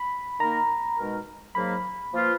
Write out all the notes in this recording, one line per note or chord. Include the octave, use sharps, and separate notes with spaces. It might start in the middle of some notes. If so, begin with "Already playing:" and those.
Already playing: B5
D#3 A#3 D#4 A#4 A#5
B2 G#3 D#4 A#4
G#2 F#3 A#3 B5
F3 A#3 F4 B4